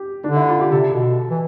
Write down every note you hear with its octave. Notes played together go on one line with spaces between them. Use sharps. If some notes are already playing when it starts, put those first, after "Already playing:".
Already playing: G4
D3 D4
E4
F4
G4
C3 A4
B2
E3